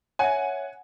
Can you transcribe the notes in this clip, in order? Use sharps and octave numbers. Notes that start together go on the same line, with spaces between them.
C#5 E5 F#5 G#5